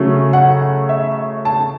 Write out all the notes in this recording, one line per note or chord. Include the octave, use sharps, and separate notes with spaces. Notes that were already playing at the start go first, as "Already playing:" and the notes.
Already playing: C#3 F#3 A3 C#4
F#5
E5
A5